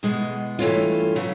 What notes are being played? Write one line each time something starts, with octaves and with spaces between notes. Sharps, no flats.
E2 B2 G#3 B3
G2 E3 A3 C#4 F4
C#3 F#3 A3